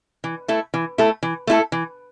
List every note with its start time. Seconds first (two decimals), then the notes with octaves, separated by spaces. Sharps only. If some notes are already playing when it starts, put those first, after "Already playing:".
0.24 E3
0.48 A3 E4 A4
0.74 E3
0.98 A3 E4 A4
1.23 E3
1.47 A3 E4 A4
1.72 E3